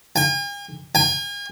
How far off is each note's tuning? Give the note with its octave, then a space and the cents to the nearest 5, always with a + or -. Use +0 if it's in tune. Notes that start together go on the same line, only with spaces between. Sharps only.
G#5 -45
G#5 -40